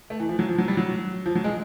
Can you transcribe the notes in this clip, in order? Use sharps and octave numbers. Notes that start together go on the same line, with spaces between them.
A3
E3
F3
F#3
F3
F#3
G3
F#3
F3
F#3
G#3